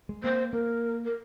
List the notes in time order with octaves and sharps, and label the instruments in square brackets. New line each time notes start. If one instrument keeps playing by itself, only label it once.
[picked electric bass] G#3
[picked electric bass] A#3 [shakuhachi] C5
[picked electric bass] A#3 [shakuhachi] A#4
[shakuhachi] A#4